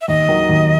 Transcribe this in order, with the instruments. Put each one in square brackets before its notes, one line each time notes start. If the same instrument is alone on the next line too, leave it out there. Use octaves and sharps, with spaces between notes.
[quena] E5
[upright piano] D#2 [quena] D#5
[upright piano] D#3 F#3
D#2